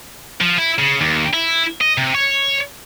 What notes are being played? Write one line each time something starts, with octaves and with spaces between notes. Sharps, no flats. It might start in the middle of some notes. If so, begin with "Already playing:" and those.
F3
E4
C#3
D#2
E4
D#5
C3
C#5